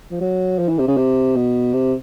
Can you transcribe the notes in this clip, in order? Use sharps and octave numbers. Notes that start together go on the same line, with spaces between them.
F3
F#3
F3
E3
C3
C#3
C3
B2
C3